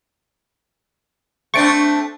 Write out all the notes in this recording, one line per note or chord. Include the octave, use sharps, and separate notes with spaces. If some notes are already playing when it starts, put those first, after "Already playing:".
A3 C4 D4 C#6 A6 D7